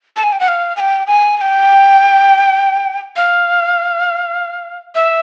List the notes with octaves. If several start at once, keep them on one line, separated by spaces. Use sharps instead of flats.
A5
G#5
G5
F#5
F5
G#5
G5
G#5
G#5
G5
F5
E5